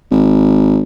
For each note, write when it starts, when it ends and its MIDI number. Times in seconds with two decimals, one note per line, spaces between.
0.11 0.82 32